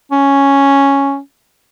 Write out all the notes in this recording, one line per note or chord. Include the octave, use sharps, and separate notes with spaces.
C#4